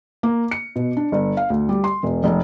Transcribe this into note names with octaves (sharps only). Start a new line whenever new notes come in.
A#3
C#7
B2
D4
G1
F5
D2
G3
C6
E1
F1